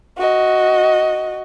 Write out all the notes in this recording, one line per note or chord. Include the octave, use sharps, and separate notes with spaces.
F#4 D#5